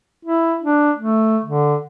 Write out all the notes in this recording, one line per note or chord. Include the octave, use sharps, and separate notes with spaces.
E4
D4
A3
D3